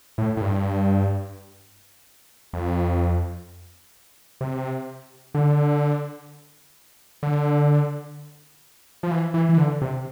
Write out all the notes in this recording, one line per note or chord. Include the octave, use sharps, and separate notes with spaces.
A2
A2
G2
F2
C3
D3
D3
F3
E3
E3
E3
D3
C3